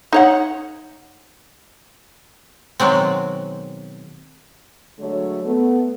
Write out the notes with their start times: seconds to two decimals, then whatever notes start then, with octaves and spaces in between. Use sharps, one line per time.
0.13 D#4 C#5 F#5
2.80 B2 D#3 F#3 G#3 C4
4.98 D3 F#3 G#3 A3 C#5
5.44 A3 B3